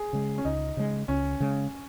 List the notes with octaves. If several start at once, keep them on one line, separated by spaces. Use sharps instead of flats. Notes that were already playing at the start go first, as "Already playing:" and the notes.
Already playing: G#4
C#3 G#3
C#4
C#2 D#4
C#3 G#3
C#2 C#4
C#3 G#3